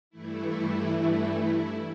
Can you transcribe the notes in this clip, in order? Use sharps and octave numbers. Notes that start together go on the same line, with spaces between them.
G2 E3 A3 E4
E4
E4